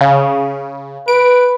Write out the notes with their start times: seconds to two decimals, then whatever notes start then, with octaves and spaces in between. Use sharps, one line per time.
0.01 C#3
1.08 B4 D7